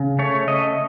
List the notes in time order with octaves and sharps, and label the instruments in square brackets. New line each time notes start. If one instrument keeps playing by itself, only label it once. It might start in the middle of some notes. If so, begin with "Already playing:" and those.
Already playing: [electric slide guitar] C#3
A3 C#5
A3 D#5